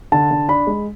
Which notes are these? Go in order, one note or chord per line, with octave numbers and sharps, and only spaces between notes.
D3 A5
D3
D4 B5
G#3